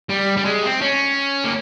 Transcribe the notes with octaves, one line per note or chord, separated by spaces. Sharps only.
G3
G3
G#3
C4
C#4
A#3